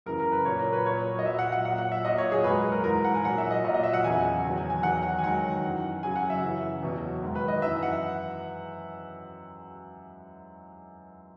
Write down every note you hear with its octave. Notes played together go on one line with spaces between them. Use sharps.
F#2 C#3 E3 A#4
A#4
B4
A#2 F#3 C#5
A#4
B4
A#2 F#3 C#5
D#5
A#2 F#3 E5
F#5
F#5
A#2 F#3 F#5
F#5
E5
A#2 F#3 D#5
C#5
G#4
G#2 F#3 B4
A#4
G#2 E3 A#4
F#5
G#5
A#2 F#3 F#5
E5
D#5
A#2 F#3 D#5
D#5
E5
F#5
E2 C#3 F#3 G#5
E2 D#3 F#3
G#5
G#5
E2 D#3 F#3 F#5
F#5
G#5
G#2 D#3 F#3 F#5
F#2 E3
F#2 C#3 F#3 G#5
F#5
E5
F#2 C#3 E3
E2 B2 F#3
G#2 D#3 F#3
B4
D#5
F#2 E3 E5
F#5